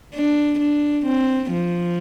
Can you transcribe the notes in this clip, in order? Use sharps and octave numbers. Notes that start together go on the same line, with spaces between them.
D4
D4
C4
F3